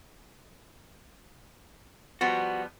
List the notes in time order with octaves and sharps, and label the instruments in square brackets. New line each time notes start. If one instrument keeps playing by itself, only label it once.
[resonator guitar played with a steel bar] F3 G3 B3 [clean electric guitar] F#4